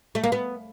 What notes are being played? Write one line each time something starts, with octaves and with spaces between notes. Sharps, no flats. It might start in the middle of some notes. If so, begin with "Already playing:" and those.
A3
A#3
B3